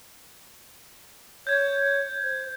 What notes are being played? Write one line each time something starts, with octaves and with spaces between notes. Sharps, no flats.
C#5 G6 G#6
C5